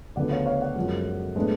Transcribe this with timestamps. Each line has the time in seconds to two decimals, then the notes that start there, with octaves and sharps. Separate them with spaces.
0.16 D2 C#3 F3 B3 D4 D5 F#5
0.31 C#5 F5
0.46 C#5 F5
0.61 D5 F#5
0.76 F#2 F3 G#3
1.36 A2 G#3 B3 D4